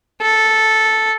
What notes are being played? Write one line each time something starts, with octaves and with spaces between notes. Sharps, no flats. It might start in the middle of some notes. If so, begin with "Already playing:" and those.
A4